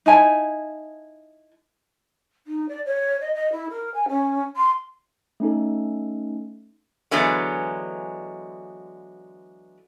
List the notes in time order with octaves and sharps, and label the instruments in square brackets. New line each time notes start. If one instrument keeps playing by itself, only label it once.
[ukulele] D#4 E4 G#5 A5
[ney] D#4
D5
C#5
D#5
D#5
E4
A#4
G#5
C#4
C6
[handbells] A3 C#4 D#4 A4
[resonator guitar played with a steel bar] D3 E3 F#3 G#3 B3